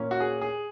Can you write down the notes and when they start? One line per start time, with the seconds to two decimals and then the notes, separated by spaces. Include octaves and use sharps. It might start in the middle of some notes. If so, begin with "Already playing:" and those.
Already playing: A#2 A#3 C#4
0.11 F#4
0.20 G#4
0.41 G#4